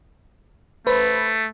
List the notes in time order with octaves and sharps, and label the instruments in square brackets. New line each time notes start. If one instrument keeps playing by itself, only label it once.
[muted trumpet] A3 [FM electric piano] B4 C5